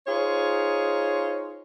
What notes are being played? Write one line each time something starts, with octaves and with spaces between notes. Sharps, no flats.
D#4 F4 G#4 C5 C#5